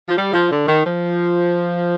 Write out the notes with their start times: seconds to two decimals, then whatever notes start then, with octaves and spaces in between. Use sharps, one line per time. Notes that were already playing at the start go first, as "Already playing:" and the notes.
0.09 F3
0.17 G3
0.33 F3
0.50 D3
0.67 D#3
0.85 F3